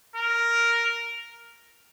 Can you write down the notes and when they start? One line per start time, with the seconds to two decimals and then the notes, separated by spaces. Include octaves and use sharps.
0.15 A#4